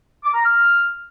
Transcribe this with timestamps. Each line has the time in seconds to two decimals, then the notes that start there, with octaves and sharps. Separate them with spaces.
0.24 D6
0.34 A#5
0.44 F6